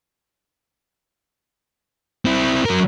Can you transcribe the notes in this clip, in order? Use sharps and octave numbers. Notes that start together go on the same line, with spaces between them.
C4 E4
F#3 A#4